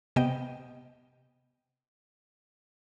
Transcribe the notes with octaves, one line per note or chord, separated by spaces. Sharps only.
C3 B3 D#5 G5